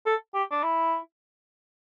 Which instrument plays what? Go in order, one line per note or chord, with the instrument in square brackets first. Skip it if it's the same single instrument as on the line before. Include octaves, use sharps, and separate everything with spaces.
[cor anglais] A4
G4
D4
E4